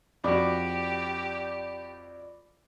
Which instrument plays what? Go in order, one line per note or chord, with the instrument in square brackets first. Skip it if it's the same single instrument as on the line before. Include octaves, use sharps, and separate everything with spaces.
[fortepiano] F2 F#4 [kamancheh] G4 [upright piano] D5 B5 D6